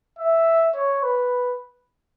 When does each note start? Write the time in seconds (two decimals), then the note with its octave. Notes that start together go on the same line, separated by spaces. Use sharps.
0.19 E5
0.75 C#5
1.03 B4